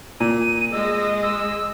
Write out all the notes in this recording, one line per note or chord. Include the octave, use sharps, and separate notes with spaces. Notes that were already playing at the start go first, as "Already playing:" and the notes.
A#2 D#7
G#3 G#4 D#5 E6
E6